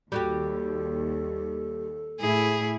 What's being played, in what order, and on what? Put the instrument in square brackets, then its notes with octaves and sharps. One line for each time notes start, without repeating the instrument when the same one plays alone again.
[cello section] D#2 [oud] G3 F#4 G4 [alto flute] A4
[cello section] A2 E4 [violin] G#4